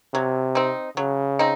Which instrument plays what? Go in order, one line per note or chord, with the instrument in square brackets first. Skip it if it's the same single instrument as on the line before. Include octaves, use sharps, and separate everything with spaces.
[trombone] C3 [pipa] F#3
[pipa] C4 D#4
[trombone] C#3 [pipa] F#3
[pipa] C4 D#4